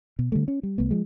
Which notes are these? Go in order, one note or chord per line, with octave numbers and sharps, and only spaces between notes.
B2
D3 G3 A3
C#4
G3
C2 A3 B3
F3 G#3